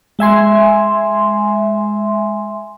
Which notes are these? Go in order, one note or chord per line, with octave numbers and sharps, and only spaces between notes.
G#3 E5 G#5 C6